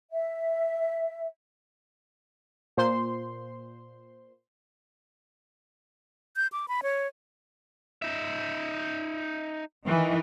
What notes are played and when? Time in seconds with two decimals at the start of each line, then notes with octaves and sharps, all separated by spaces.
0.12 E5
2.77 A#2 C5 C6
6.36 G6
6.52 D6
6.68 B5
6.83 C#5
8.02 D#4 E5
9.85 D#3 E3